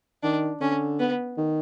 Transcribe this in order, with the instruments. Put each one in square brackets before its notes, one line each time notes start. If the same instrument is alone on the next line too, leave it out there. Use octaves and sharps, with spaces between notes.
[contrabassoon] D#3 [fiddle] D4
[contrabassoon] D3 [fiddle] C#4
[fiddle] B3
[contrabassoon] D#3